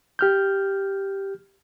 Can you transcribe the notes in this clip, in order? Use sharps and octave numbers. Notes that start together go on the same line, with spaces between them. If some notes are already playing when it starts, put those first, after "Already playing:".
G4 F6 G6